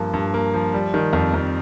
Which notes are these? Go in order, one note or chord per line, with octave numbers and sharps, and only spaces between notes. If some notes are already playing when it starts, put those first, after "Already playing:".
Already playing: G2 F3 A#3
G2
A#3
F3
G3
D#3
F2
F2